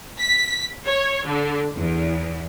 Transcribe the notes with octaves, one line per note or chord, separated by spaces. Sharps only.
B6
C#5
D3
E2